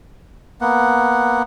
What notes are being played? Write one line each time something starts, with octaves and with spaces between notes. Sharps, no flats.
A#3 B3 F#5